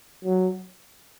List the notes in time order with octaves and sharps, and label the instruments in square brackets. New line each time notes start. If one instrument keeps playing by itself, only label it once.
[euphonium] F#3